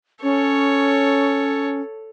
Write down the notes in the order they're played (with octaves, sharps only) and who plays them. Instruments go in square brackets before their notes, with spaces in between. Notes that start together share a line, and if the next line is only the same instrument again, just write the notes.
[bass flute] C#4 [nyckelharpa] A4 C#5